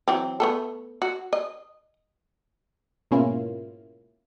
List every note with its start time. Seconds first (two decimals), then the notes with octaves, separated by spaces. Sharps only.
0.08 E3 F#3 C4
0.40 A3 B3 A4
1.02 F#4
1.33 D#5
3.11 G#2 B2 A#3 C#4 E4 F4